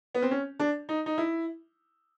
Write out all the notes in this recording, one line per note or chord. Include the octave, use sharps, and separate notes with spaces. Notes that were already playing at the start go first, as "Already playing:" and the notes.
B3
C4
C#4
D4
D#4
D#4
E4